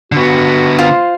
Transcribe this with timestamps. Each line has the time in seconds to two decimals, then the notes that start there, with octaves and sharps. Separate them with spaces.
0.12 D3 B3 F#4
0.79 F4 C5